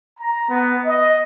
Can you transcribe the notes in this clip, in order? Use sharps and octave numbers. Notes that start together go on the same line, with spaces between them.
A#5
B3
D#5